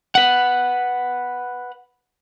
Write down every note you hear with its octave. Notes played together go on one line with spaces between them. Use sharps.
B4 F#5